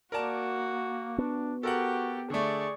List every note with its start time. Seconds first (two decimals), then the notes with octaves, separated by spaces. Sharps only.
0.12 A#3 F#4 A#4 D5 A5
1.18 B3 D4
1.63 F#4 G4 A4 A#4 F#5
2.30 D3 A3 G#4 D5 C#6